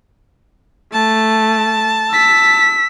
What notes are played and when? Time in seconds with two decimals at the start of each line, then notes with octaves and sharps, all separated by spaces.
0.93 A3 A5
2.12 E6 B6